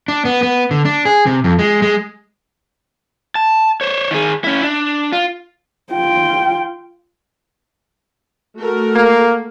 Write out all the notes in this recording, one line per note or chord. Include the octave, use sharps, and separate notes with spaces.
D4
B3
B3
D3
D4
G#4
C3
F2
G#3
G#3
A5
C5 C#5
D#3 G#4
C#4 E4
D4
F4
F4 G5
A3 F#4 A#4
A#3